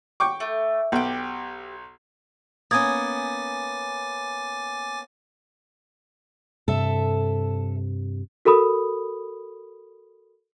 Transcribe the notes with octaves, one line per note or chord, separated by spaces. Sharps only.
G5 C#6 D6
A3
B1 G4 B4
A#3 B3 C#4 G#5 D6 D#6 G#6 A6
G2 C3 A4 E5
F#4 A4 A#4 B5 D#6